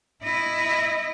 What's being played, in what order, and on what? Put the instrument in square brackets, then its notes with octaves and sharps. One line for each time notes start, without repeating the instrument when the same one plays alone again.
[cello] E4 D#5